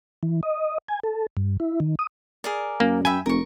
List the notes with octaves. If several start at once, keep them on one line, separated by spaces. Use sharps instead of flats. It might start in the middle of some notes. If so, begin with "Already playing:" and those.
E3
D#5
G#5
A4
G2
E4
D#3
D#6
G#4 A#4 D5
F#2 A#3
E5 G5 G#5 B5
F1 A#4 C#6